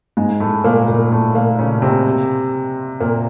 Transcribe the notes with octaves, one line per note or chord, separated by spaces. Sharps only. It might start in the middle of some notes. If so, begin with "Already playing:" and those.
G#2 G#3
A2 A3
A#2 A#3
A#2 A#3
A2 A3
A#2 A#3
C#3 C#4
C3 C4
A#2 A#3